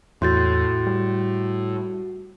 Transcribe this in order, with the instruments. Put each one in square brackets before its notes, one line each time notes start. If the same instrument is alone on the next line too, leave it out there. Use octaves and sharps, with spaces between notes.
[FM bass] E2 [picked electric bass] A2 [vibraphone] F#4 [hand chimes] C6 G6 A6
[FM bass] G3